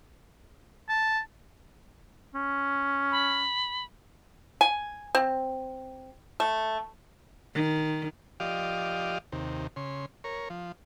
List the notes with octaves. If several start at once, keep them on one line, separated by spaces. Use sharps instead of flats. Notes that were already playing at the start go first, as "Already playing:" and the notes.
A5
C#4
B5
G#5
C4
A3
D#3
F3 G4 D5 D#5 F5
D#2 C3
C#3 C6
A#4 C#5
F3